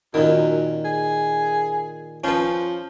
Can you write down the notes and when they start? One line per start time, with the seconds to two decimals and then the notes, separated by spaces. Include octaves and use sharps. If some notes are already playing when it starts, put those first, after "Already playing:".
0.14 F#2 A#2 D#3
0.85 G#4
2.24 F3 C#4 B4